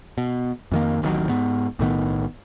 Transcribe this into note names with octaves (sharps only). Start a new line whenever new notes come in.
B2
F2 D#3 A#3
D1 A1 D#3 F#3
G#2 B3
B1 A2 D#3 B3